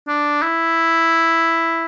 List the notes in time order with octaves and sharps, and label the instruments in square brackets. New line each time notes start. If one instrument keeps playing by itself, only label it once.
[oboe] D4
E4